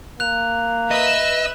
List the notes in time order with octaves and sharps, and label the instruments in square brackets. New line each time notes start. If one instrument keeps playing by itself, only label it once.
[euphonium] A#3 [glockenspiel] F#6 F7
[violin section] B4 E5 E6 [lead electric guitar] D#5